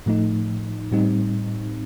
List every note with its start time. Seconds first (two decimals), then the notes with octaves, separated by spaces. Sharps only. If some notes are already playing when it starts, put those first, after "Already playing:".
0.06 A2 F3 A3 D#4
0.92 A2 G3 C4 D#4